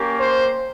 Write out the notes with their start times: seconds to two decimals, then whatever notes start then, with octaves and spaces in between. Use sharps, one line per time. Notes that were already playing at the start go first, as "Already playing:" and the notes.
Already playing: A#3 C#4 G4
0.18 C5